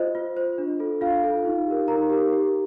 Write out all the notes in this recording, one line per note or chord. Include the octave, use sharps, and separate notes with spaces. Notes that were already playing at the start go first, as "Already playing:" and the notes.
Already playing: F4 C5 D#5
F4
C5
D4
F4 A4
D4 F4 F5
F4 A4
D#4
G4 A#4
D#4 A#4 A#5
G4 A#4
G4